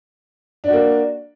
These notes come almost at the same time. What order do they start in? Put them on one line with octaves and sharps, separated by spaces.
D4 F#4 A#3